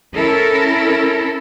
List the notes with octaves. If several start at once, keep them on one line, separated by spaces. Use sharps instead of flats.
C#4 E4 A4 A#4